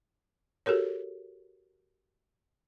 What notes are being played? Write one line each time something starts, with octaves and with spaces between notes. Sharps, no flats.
F#4 G4 A4 A#4 C#5